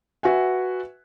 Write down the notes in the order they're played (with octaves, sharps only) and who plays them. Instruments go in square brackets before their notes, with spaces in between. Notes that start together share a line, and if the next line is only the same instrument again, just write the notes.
[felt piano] F#4 B4 E5 F#5 G#5